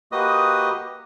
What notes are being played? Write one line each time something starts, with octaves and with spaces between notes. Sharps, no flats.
A#3 F#4 G4 B4 D#5 D#6